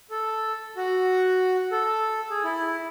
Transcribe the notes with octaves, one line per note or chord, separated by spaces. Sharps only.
A4
F#4
A4
G#4
E4